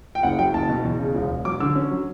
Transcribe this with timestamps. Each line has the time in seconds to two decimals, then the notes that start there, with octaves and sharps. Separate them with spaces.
0.15 G5
0.23 F#1 F#5
0.39 F#3 G5
0.54 F#1 A5
0.69 B2
0.84 E2
0.99 C#3
1.15 E1
1.30 E1
1.45 F#3 D6
1.60 D3 E6
1.75 C#4
1.91 F#3